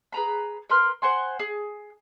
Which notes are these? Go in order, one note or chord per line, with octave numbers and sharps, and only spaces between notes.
G#4 B4 A#5 B5
A#4 B4 C6 F6
C5 F#5 G#5 C6
G#4